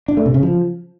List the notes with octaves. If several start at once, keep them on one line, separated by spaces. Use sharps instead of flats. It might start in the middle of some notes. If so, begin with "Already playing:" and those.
D4
A3
C3
C#3
F3